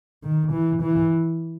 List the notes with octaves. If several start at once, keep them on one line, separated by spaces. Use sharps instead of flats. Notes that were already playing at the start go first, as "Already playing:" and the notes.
D#3
E3
E3